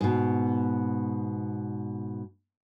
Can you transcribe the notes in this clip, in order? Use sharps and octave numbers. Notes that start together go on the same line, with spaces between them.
G#2 B2